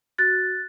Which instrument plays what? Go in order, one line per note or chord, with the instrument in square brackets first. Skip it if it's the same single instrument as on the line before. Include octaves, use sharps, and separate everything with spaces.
[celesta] F#4 F#6 A6